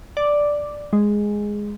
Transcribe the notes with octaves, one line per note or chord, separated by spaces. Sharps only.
D5
G#3